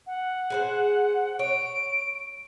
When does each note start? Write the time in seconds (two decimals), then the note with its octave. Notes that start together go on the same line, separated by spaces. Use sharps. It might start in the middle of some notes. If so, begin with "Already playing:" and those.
0.07 F#5
0.50 G#4 B4 C5
1.39 C#5 D7